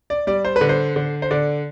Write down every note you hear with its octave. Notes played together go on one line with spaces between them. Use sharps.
D5
G3 D5
C5
B4
D3
C5
D3
C5
D3 D5